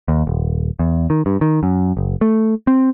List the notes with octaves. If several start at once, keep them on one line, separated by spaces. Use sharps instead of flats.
D#2
D#1
E2
D#3
G2
D#3
F#2
F#1
A3
C4